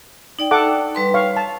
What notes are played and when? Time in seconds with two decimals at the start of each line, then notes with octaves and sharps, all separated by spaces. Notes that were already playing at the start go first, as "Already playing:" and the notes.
0.39 D#4 D5 G5
0.51 A4 F#5 D6
0.95 G3 B4 C6
1.14 C#5 F5 C#6
1.36 F5 A5